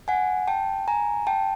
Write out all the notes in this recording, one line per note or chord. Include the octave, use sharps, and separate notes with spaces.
F#5 G#5
G5 A5
G#5 A#5
G5 A5